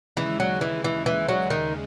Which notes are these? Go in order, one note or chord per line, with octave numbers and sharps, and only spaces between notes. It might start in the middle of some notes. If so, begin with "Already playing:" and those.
D#2 C#3 E3 G#3
F#3
E3
E3
E3
F#3
D#3